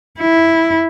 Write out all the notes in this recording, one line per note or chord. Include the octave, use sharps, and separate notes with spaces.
E4